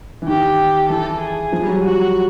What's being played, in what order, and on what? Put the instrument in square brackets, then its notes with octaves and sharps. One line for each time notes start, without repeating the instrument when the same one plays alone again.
[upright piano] E3
[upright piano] D#3 [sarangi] G4
[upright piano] E3 [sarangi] A4
[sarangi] G#4
[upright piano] F3
G3
F#3
[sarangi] F#4